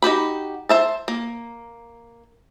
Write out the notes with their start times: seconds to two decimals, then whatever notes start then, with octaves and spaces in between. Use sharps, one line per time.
0.02 D#4 F#4 G4 B5
0.69 C5 E5 A5
1.08 A#3